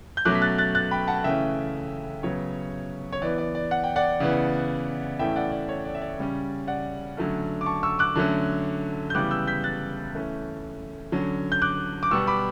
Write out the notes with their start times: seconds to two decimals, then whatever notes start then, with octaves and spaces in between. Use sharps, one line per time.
0.17 G6
0.25 B2 F#3 A3 C#4 D6 F#6
0.34 B6
0.42 F#6 A6
0.58 F#6 A6
0.75 F#6 A6
0.91 G5 B5
1.08 F#5 A5
1.24 C#3 E3 A3 C#4 E5 G5
2.23 C#3 F#3 B3 C#5
3.12 C#5
3.22 E3 B3 D5
3.38 D5
3.55 D5
3.71 F#5
3.84 G5
3.96 D5 F#5
4.20 C#3 E3 B3
5.19 A2 E3 A3 C#4 E5 G5
5.36 D5 F#5
5.52 D5
5.69 C#5
5.85 D5
5.95 E5
6.02 D5
6.18 C#3 G3 C#4
6.67 D5 F#5
7.17 D3 F#3 A3 C#4
7.61 D6
7.66 A5 C#6
7.83 C#6 E6
7.99 D6 F#6
8.15 D3 F#3 A3 C#4
9.10 G6
9.15 C#3 E3 G3 B3 D6 F#6
9.31 E6 G6
9.47 G6 B6
9.64 F#6 A6
10.13 E3 A3 C#4
11.12 D3 F#3 C#4
11.52 G6
11.62 D6 F#6
12.03 D6
12.11 B2 G3 B3 C#6 E6
12.27 B5 D6